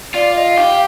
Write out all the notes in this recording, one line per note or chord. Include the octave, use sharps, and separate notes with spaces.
F4 D5
D#5
G4 F5